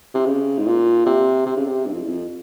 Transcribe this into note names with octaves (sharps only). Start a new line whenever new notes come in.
C3
C#3
G#2
A#2
C3
C3
C#3
C3
G2
F2
E2
F2